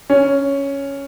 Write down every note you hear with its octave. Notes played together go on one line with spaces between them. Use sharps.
C#4